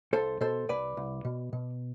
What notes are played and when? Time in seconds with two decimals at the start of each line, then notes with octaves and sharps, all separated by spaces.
0.13 C2 A4 C5
0.41 B2 A4 C5
0.69 C2 B4 D5
0.97 C2
1.25 B2
1.53 B2